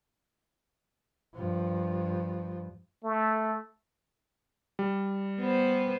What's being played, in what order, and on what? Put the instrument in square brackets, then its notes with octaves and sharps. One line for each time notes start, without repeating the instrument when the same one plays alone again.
[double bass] G2 F3
[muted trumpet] A3
[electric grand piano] G3
[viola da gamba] B3 B4 C5